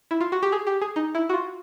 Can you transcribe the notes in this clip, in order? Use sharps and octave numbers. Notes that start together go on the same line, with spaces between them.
E4
F4
F#4
G4
G#4
G4
G#4
D#4
E4
F#4
F4